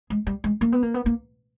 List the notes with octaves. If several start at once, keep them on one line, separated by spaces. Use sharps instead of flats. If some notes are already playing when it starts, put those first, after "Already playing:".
G#3
G3
G#3
A#3
B3
A#3
B3
A#3